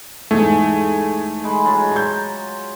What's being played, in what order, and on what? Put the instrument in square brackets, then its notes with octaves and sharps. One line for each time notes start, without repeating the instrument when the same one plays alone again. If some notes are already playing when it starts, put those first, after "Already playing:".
[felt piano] E2 G#2 [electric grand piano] A3 [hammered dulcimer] G#4
[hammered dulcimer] G#3 B5
F#3 F4 G#4
[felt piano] A#5 G6